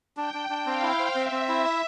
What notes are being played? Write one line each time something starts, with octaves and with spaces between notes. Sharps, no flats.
D4 G5
D4
D4
C4 F5
E4
C5
C4 E5
C4
E4
E5